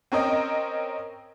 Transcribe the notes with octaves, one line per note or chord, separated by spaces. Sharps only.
C4 C#4 A#4 D#5 G5